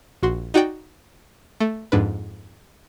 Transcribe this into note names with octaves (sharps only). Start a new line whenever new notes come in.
A#1 F#4 C6
D#4 F#4 D5 G5
A3
F2 G#2 D4 B4